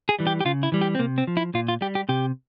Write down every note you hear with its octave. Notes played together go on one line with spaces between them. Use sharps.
G#4
E3 G3
G4
G4
C#3 F4
E4
E3 G3
G4
C4
C3 A#3
C4
F3
E4
A#2 F4
F4
G3 G4
G4
C3 G4